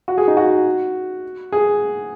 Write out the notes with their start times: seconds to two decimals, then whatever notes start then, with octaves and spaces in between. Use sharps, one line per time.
0.08 F#4
0.18 G#4
0.28 D#4
0.37 F#4
1.52 G#4